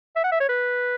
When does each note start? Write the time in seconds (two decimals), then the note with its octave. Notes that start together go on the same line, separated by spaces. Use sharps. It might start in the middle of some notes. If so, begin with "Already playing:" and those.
0.16 E5
0.24 F#5
0.32 E5
0.40 C#5
0.49 B4